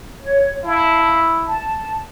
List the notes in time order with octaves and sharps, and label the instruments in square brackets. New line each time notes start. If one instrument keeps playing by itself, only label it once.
[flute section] C#5
[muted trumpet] E4 [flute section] F5 A5
[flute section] A5